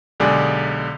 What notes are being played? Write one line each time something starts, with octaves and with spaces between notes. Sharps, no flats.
B1 D3 G#3 G4 G#4 D5